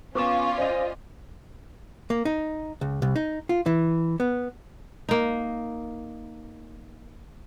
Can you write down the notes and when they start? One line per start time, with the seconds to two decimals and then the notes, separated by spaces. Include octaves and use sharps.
0.15 B3 C#4 F4 C#6 D6 E7
0.58 C5 D5 D#5
2.10 A#3
2.25 D#4
2.81 C#2
3.02 C2
3.16 D#4
3.49 F4
3.66 E3
4.20 B3
5.09 A#3 D#4